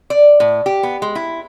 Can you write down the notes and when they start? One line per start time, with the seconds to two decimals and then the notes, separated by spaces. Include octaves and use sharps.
0.10 D5
0.40 A2
0.66 G4
0.83 B3
1.02 G#3
1.15 E4